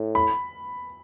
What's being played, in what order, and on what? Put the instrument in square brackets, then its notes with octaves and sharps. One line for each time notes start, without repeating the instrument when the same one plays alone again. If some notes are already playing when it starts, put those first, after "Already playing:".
Already playing: [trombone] A2
[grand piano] B5